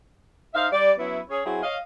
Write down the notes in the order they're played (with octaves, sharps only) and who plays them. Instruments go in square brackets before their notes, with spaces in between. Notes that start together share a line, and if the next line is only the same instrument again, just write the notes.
[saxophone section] D#4 C5 E5 F5
G3 D5
F#3 B3 C#4 E4
C#4 G#4 C#5
F#3 C4 E4 F#4 G#4
C#5 D#5 F5